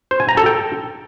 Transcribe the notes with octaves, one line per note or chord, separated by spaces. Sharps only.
C5
G#5
A#5
A4
G5